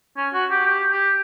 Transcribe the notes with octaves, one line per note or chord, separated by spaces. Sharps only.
C#4
F#4
G4
G4
G4